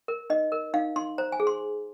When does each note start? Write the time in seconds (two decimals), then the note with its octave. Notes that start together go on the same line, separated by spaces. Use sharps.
0.08 A#4
0.30 D#4 D#5
0.52 A#4
0.74 D#4 F5
0.96 D#4 C6
1.18 C5 A#5
1.32 G#5
1.40 G#4
1.47 C6